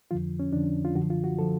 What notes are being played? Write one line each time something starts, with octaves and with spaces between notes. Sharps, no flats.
F2 D3 F3 F4
C#4
F2 D3 F3 D4
F4
F#2 D3 F3 F#4
F4
F#4
D3 F3 A4